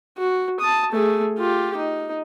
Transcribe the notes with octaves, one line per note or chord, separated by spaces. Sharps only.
F#4
A5 D#6
A3 G#4
F4 G4
D#4